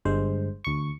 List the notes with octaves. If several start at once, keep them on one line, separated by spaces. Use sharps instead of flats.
G1 G2 G#3 C5
D2 C#6